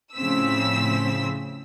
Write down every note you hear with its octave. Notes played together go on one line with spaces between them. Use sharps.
A2 C#3 F3 C4 E6 B6